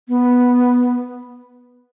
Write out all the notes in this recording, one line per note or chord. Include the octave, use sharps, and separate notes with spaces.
B3